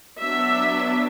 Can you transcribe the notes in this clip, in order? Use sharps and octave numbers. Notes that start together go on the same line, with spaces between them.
F#3 B3 D4 E5